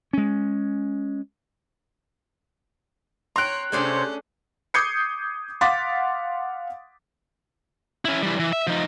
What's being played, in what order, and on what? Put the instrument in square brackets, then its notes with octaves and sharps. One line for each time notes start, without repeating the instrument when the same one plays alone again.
[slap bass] G#3 C#4
[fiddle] C#5 [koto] G5 A#5 [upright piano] C6 F#6
[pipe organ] C3 C5 C#5 [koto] A3 D4 G#4 [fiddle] C#4
[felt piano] D6 D#6 G6 G#6 C7 C#7
F5 F#5 C6 D6 A6 B6
[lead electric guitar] C#4 E4
E3 G3
E3
E5
F3 D#4